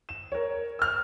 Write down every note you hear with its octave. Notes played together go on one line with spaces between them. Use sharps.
E7
A#4 C#5
E6 F6